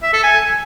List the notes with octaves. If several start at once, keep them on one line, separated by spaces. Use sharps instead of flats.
E5
A4
G#5